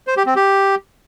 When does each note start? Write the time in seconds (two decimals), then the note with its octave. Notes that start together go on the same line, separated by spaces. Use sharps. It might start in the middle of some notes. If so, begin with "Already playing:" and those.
0.07 C5
0.17 G4
0.26 C4
0.36 G4